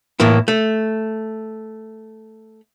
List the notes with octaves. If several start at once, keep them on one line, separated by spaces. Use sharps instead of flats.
A2 E3 A#3 E4
A3